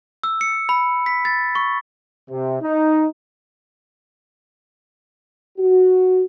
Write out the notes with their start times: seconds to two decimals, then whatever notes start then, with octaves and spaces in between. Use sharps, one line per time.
0.23 E6
0.41 C#7
0.69 B5
1.06 B6
1.25 A6
1.55 C#6
2.30 C3
2.62 D#4
5.58 F#4